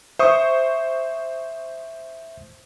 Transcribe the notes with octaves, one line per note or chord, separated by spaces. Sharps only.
C5 E5 C#6 D#6